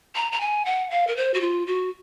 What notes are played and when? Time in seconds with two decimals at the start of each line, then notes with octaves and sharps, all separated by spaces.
0.15 A#5
0.32 A#5
0.40 G#5
0.65 F#5
0.91 F5
1.07 A#4
1.16 C5
1.34 F#4
1.41 F4
1.67 F#4